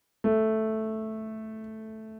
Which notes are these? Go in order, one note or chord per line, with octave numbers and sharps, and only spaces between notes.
A3